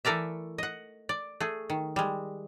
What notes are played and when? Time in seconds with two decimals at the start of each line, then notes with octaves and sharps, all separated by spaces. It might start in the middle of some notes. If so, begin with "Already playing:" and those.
0.05 E3 A3 A4 A#4 D5 E5
0.58 D#5 F#5
1.09 D5
1.40 A3 G#4
1.70 D#3
1.96 G3 G#3